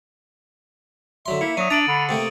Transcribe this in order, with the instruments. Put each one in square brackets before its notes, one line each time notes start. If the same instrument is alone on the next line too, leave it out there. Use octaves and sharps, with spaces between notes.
[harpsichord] D3 F#3 C6 [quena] E5
[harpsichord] A#3 [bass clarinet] E4 [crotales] C#7
[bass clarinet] F#3 [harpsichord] D4 [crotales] D#6 D#7
[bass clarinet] D4 [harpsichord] A#5 [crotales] A6 D7 F#7
[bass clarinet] D3 [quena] B5
[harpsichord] C3 A3 A#3 [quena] G5